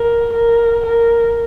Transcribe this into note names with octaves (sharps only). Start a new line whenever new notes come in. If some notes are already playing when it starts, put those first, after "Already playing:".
Already playing: A#4
A#4
A#4